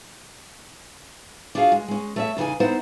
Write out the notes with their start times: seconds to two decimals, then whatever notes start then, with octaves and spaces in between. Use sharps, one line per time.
1.55 D4 F4 F#4 G#4 C#5 F5
1.72 G#3
1.88 G#3 C#4
2.16 A3 C#5 E5
2.37 E2 C#3 D#4 D5 G#5
2.60 B3 D#4 E4 C5 E5 F#5